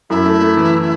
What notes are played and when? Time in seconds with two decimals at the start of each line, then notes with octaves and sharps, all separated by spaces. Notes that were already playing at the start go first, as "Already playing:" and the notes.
0.10 F#2 E4
0.26 A3
0.41 A3
0.57 E3